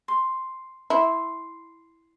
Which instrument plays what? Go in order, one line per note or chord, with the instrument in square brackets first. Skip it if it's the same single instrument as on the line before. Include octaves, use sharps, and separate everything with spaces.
[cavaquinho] C6
[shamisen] E4 [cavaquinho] C6